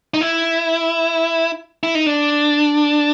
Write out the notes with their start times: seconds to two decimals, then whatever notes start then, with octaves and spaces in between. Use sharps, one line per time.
0.14 D#4
0.21 E4
1.83 E4
1.95 D#4
2.06 D4